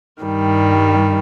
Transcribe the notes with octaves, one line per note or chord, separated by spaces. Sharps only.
G2 D#3 G3